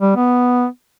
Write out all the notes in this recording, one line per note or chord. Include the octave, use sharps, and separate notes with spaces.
G3
B3